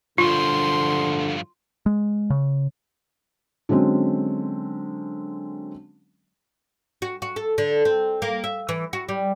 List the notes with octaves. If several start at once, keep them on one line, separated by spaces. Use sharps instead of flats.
G2 D3 F3 F4 C6
G#3
C#3
D3 F#3 G#3 C4 C#4
F#4
F#4
A4
D3
C4
A#3
E5
E3
F#4
G3